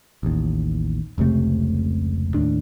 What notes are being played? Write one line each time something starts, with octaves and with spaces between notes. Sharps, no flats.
A1 D#2
F1 C#2 C3 A3
D#2 A2 D4